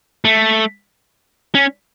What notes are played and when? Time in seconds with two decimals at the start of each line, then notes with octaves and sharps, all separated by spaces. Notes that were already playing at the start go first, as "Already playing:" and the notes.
0.25 A3
1.55 C#4